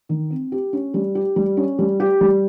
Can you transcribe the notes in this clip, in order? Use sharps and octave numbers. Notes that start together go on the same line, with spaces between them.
D#3
C4
G4
C#4
G3
G4
G3
C#4
G3
G4
G3